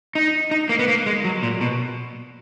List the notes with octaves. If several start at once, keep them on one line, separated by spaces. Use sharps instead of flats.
D#4
D#4
A#3
B3
A#3
G#3
F#3
A#2
B2